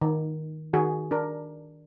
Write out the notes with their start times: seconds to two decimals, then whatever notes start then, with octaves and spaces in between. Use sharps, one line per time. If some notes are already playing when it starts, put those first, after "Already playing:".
0.02 D#3
0.74 D#3 F#4 G#4
1.11 D4 A#4